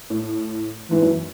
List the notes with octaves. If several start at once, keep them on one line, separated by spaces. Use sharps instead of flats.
A2
G#2 E3
F#2